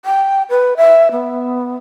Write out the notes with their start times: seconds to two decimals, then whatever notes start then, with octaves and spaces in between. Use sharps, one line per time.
0.05 G5
0.50 B4
0.77 E5
1.12 B3